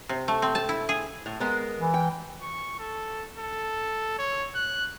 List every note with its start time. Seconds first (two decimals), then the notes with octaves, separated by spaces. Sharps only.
0.09 C3
0.28 A3
0.42 C4
0.55 A5
0.69 E4
0.89 G#4
1.26 A2
1.40 G#3 B3 A#4
1.79 E3
1.94 G5
2.42 C#6
2.79 A4
3.38 A4
4.18 C#5
4.55 F#6